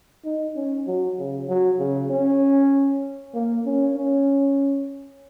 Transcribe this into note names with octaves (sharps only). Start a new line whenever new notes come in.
D#4
C#4
F#3
C#3
F#3
C#3
C#4
A#3
C#4
C#4